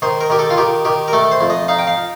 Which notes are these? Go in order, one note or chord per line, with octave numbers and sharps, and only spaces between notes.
D#3 C5
A#4
D#3 G4
A4
F4
D#3 G4
D#3 G4
A#4
A3 A4
C5
F2
D#5
D#4 F5
G5
F5